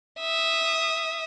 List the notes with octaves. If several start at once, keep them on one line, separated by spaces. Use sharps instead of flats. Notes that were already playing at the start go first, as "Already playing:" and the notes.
E5 D#6